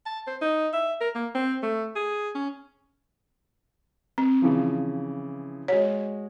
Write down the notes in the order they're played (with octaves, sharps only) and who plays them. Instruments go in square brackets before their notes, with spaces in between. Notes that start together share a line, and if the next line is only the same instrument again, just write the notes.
[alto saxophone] A5
C5
D#4
E5
A#4
A#3
C4
A3
G#4
C#4
[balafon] C4
[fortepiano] C#3 E3 F3
[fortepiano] G#3 F#4 [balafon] C#5